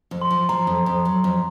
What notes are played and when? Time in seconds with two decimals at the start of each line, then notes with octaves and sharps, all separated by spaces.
0.11 F2
0.22 C6
0.31 F3
0.49 F3 A#5
0.67 F2
0.86 F2
1.05 F#3
1.24 F2